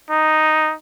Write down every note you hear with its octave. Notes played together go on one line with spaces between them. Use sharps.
D#4